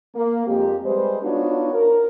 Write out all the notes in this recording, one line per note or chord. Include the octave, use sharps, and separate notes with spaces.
A#3
F2 G#3 C4 G4
G3 G#3 B4 C5
B3 D4 D#4 F4 F#4 C#5
A#4